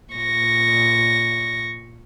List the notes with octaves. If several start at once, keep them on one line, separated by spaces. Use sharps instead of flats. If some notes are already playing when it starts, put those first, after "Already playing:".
A#2 C#6 A#6